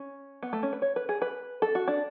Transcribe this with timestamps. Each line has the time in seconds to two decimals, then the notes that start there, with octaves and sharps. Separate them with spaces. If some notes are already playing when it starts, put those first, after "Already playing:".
Already playing: C#4
0.43 B3
0.53 A3
0.63 C#4
0.73 B4
0.82 C#5
0.96 B4
1.09 G#4
1.22 B4
1.62 A4
1.75 F#4
1.88 D4